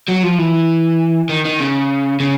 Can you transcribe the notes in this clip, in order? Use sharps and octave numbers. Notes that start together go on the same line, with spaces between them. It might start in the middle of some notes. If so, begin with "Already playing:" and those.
F#3
F3
E3
D#3
D#3
C#3
C#3